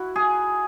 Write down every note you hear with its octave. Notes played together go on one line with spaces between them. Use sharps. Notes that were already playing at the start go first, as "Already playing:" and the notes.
Already playing: E4 F#4
G#4